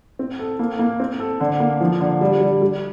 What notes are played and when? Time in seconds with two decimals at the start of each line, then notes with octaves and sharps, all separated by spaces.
0.19 C4
0.39 A4
0.59 A#3
0.79 A#3
1.00 C4
1.19 A4
1.40 D3
1.60 A#3
1.81 F3
2.00 D3
2.21 G3
2.41 G3
2.61 G3